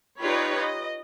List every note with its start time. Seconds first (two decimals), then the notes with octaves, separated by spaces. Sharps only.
0.21 D#4 F4 G4 B4 C#5 D5
0.57 D#5